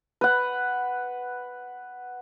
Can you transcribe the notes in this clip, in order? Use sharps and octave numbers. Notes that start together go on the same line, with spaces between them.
B4 F#5